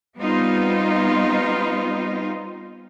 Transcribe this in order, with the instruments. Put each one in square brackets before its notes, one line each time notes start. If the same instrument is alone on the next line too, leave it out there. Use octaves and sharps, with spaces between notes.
[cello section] G3 B3 C4 D#4 F4